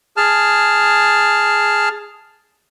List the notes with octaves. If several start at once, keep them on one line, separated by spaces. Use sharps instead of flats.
G#4 A5 F6